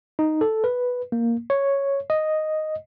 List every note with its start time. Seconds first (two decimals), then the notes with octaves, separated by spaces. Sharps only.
0.19 D#4
0.41 A4
0.64 B4
1.12 A#3
1.50 C#5
2.10 D#5